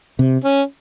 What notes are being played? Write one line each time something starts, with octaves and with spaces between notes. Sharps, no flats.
C3
C#4